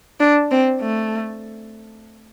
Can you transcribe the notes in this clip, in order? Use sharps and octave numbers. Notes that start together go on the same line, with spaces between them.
D4
C4
A3